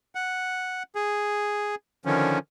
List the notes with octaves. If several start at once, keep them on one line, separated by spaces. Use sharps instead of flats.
F#5
G#4
D3 D#3 F3 C#4